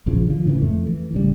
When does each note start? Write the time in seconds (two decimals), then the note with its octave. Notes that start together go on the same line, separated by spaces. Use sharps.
0.06 A#1 E2 C#3 F3
0.27 D3 F3
0.45 A2 C#3 E3
0.61 F2 A3
0.87 E3
1.13 A1 C#3 G3